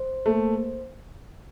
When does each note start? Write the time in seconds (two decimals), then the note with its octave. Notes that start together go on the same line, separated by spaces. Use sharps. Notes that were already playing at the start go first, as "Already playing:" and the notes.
Already playing: C5
0.26 A3 A#3